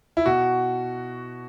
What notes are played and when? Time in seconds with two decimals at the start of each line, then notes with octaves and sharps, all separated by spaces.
0.17 E4
0.26 B2 F#4